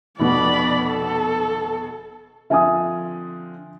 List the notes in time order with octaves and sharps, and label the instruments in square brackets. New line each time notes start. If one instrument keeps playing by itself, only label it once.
[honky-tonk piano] F1 B2 F#4 [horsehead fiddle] D5 B5
[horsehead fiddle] A4
[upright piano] D3 F3 C4 [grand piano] E5 G#5 D#6